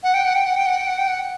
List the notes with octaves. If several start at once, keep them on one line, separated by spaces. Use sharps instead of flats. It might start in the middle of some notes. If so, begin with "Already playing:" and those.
F#5
G5
F#5
G5
F#5
G5
F#5
G5
F#5
G5
F#5